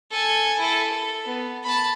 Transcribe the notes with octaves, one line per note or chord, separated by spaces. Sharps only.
A4 G#5
E4 A4
A4
B3
A5 B5